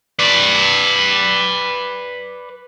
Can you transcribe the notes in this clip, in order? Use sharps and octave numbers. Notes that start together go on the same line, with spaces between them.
B4 D5